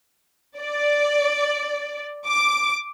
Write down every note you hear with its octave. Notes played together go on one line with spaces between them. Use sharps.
D5
D6